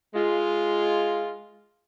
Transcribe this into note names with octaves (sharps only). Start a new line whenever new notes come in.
G#3 F4